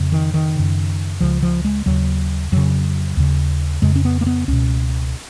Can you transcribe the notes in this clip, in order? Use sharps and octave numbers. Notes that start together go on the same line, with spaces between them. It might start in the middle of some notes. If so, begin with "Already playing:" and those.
Already playing: F2 C#3
D#3
D#3
F#2 C#3
C#2 C#3 F3
F3
G#3
D#2 C#3 F#3
F2 C#3 F#3
D#2 C#3
F2 C#3 G#3
C#4
B3
A#3
B3
C#2 B2 C#4